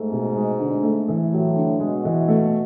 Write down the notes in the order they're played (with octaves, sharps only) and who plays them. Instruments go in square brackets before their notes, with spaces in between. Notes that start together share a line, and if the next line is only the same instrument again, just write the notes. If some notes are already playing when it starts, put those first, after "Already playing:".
Already playing: [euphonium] G#2 [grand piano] A3
[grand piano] B2
G#3
D3
A3
E3
[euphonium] A2 [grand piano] F#3
[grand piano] D3
[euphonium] B2 [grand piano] G#3
[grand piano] E3
A3